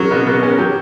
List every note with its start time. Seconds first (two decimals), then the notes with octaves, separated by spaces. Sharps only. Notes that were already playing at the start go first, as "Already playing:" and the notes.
Already playing: F#3 A#4
0.11 B2
0.27 B2
0.40 C#4 B4
0.50 A#4
0.58 F#3 G4